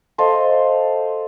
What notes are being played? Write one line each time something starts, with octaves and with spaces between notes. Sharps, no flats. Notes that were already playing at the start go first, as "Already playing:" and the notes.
A4 C5 D#5 F5